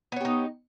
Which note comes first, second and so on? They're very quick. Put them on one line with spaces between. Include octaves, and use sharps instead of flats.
B3 C#5 G4 D#4